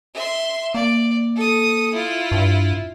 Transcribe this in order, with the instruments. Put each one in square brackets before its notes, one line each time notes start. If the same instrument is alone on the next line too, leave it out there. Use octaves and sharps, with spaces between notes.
[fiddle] E5 C6
[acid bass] A#3 [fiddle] D5
[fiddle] A4 D#6
E4 F4
[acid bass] G2